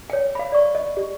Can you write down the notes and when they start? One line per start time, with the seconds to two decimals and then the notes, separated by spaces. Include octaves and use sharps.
0.10 C#5 G5
0.35 F5 B5
0.52 D5 C#6
0.75 D#5
0.97 G4